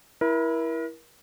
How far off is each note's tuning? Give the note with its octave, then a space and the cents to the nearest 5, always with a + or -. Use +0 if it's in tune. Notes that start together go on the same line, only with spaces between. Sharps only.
E4 +0 A#4 +35